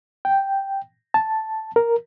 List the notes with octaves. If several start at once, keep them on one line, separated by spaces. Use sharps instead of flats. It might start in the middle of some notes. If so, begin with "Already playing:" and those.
G5
A5
A#4